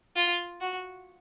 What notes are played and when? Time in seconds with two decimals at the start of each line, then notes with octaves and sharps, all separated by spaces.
0.16 F4
0.61 F#4